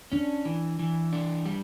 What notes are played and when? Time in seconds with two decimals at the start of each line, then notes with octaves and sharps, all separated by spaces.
0.12 C#4 D4
0.45 E3
0.79 E3
1.13 D4
1.45 G3